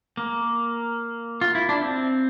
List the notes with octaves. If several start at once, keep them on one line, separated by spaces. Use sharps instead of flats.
A#3
F4
E4
D4
C4